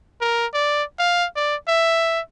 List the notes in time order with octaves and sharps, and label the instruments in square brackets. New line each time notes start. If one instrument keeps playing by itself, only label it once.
[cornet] A#4
D5
F5
D5
E5